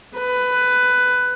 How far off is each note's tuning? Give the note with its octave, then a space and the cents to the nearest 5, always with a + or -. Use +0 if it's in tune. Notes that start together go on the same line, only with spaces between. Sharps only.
B4 +15